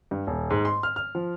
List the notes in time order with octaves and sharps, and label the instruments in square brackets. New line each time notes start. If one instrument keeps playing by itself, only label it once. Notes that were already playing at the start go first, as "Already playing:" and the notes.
[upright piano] G2
D#1
G#2
C6
F6
F6
F3